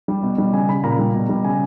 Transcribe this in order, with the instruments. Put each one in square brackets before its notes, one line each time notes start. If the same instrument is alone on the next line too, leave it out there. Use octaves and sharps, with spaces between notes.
[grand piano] G3
B2
G3
C#3 G#5
C#3 B5
A#2 A#5
G3
B2
G3
C#3 G#5